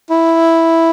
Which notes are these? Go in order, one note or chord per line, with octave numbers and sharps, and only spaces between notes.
E4